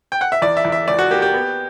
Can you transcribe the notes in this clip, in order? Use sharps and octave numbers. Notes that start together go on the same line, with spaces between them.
G5
F#5
E5
E2 D5
E5
E2
E5
C#2 D5
F#4
A#3 G4
G4
B3